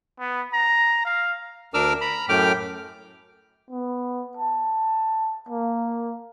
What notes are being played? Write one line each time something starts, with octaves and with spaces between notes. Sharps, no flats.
B3
A#5
F5
D2 D4 A#4 D6 E6 F6
A#5 B5
F#2 A2 A3 G5 D6 F6
B3
A5
A#3